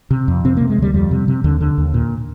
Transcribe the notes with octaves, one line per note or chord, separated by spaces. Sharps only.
C3
F2
C3 C4
A#3
C3
G#3
D2 G3
F2 G3
C3
C3
D#2 D3
D3
D#2
A#2